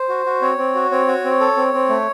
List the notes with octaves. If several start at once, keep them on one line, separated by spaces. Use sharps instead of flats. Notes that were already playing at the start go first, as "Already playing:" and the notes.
Already playing: C5
F#4
F#4
C4 C#5
C4
F#4
C4 C#5
F#4
C4
A4
C4
C4
A3